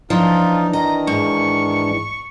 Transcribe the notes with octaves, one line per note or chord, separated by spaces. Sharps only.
E3 F3 D4 D#4 F4
D#3 D#5 A#5
G#2 C#6